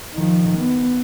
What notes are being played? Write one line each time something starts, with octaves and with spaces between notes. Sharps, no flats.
D#3 F3
B3